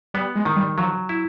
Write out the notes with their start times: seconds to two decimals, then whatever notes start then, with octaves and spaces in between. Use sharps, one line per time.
0.14 G3 B3
0.35 G#3
0.45 D#3
0.56 G3
0.78 F3 F#3
1.09 E4